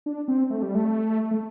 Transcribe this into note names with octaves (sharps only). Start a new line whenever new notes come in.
D4
C4
A3
G3
A3
A3